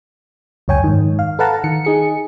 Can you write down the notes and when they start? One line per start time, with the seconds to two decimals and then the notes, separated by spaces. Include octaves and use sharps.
0.68 C#2 F#2 C#5 G5 G#5
0.84 G#2 D#3
1.19 F5
1.39 A4 B4 F5 F#5 A5 A#5
1.64 D#3 C#7
1.85 D#4 G#4 C#7